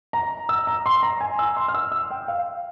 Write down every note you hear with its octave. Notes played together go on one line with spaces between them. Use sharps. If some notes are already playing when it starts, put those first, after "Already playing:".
A#5
E6
A#5
C6
A#5
G#5
E6
C6
F6
E6
E6
G5
F5